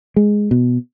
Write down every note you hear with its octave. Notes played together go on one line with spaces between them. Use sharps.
G#3
B2